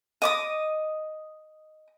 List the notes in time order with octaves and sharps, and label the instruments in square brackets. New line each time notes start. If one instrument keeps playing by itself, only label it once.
[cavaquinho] D#5 D6 D#6